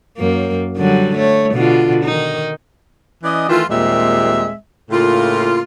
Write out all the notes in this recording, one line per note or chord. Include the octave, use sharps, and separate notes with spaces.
F#2 A#3
D3 F#3 G3
A3 C#5
B2 D3 F4
D#3 D#4
E3 C#4 D5 D#5
D#3 E3 A3 F4
D#2 A#2 G3 G#3 C4 E5
A2 C#3 A#3 F4